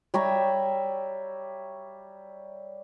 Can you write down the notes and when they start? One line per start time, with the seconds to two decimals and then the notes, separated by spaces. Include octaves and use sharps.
0.14 G3 C#5 E5 A#5